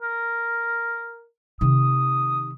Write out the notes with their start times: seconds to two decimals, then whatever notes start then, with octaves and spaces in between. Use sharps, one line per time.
0.02 A#4
1.61 C3 D#3 D#6